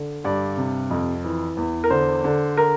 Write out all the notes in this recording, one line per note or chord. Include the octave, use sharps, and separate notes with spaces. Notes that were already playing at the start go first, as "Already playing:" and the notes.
Already playing: D3
G2 D5
C3
F2
E3
E2
A#4
D3 C5
D3
A#4